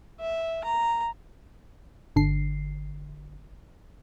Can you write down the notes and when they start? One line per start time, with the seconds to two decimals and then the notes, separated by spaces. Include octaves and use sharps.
0.20 E5
0.64 A#5
2.16 G1 D3 C7